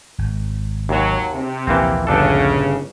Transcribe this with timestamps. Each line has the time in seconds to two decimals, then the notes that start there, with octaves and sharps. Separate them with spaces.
0.18 G#1
0.89 D#2 F#3
1.32 C3
1.67 A#1 D#2 E3 A#3 C4
2.07 G1 C#3 D4 A4